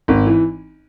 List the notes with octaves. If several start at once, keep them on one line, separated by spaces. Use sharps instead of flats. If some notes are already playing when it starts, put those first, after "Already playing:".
G#1
E3